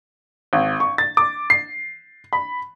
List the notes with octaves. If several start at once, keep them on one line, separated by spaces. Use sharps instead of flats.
G#1
C#6
A6
D6
C7
B5